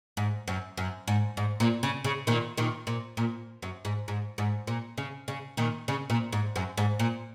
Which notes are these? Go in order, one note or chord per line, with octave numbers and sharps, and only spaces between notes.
G#2
F#2
F#2
G#2
G#2
A#2
C#3
C#3
A#2 D#3
A#2 D#3
A#2
A#2
F#2
G#2
G#2
G#2
A#2
C#3
C#3
A#2 D#3
C#3
A#2
G#2
F#2
G#2
A#2